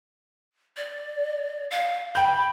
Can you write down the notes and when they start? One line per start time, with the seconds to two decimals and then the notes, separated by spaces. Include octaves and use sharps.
0.77 D5
1.71 F5
2.15 G5 B5 G6